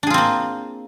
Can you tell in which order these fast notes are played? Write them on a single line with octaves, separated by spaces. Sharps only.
D4 G#4 F4 C4 A#3